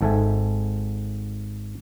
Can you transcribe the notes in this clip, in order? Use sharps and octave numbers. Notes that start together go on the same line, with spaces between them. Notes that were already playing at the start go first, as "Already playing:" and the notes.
G#1 G#2 A4 E5 G#5